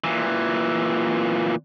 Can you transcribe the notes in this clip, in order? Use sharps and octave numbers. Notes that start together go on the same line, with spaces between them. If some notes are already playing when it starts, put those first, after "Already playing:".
A#2 E3